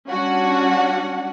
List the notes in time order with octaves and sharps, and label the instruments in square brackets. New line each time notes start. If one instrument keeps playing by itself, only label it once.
[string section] G3 C#4 D4 F#4 F#5